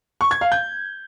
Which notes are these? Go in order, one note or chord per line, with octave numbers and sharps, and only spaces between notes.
C#6
G#6
F5
G6